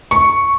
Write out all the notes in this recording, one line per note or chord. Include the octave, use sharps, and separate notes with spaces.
C#6